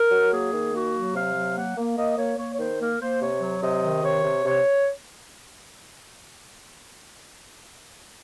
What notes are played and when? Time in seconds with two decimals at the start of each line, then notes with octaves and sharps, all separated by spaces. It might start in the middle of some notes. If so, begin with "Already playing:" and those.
Already playing: A#4
0.11 F#3
0.32 A#3 G#4
0.53 D#3
0.73 A#3 F#4
0.94 F#3
1.14 C3 F5
1.35 F#3
1.55 A#3 F#5
1.76 A#3
1.97 A#3 D#5
2.18 A#3 C#5
2.38 A#3 C#5
2.53 C#5
2.59 D#3 C5
2.79 A#3 A#4
3.00 A#3 C5
3.21 C3 C#5
3.41 F#3
3.61 C3 D#5
3.83 D#3
4.03 C3 C#5
4.24 C3
4.45 C3 C#5